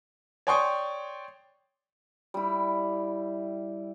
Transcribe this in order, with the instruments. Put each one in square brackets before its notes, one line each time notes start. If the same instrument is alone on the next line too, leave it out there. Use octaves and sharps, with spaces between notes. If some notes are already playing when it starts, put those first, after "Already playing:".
[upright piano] C#5 D5 G5 C6 C#6 D#6
[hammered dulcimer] G3 E4